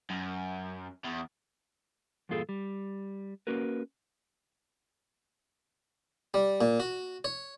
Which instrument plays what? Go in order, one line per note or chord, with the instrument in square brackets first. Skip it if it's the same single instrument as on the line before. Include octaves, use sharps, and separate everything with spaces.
[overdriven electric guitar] F#2
E2
[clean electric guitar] E2 G2 A#2 F4 G#4 A4
G3
A#3 C#4 F#4 A#4 B4
[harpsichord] G3
A#2
F#4
C#5